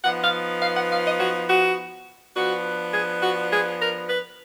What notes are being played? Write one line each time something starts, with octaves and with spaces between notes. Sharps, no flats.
F3 B3 D#4 F#5
F5
F5
F#5
F5
D#5
F#4
F#4
F3 B3 D4 F#4
G#4
F#4
G#4
A#4
B4